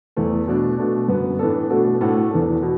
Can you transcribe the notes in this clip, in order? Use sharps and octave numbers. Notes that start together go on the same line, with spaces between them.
E2 E3 A3
B2 A3 D4 A4
B2 A3 D4
F#2 D3 B3
A2 E3 B3 D4 A4
B2 A3 D4 F#4 A4
A2 A3 D4 F#4 A4
E2 E3 D4 A4
B2